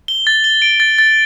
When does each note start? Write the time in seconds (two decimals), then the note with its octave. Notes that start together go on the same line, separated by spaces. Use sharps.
0.08 G7
0.27 A6
0.44 G7
0.62 D7
0.80 A6
0.98 A6